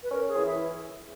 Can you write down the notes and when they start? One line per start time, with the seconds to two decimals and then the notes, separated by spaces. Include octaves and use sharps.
0.03 B4
0.11 C#4 A#4
0.28 G#4
0.37 E3
0.46 E4